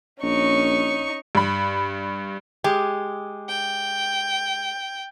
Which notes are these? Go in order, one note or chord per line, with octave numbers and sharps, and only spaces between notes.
A#1 C#4 D#4 C#6
G2 B5
G#3 G4
G5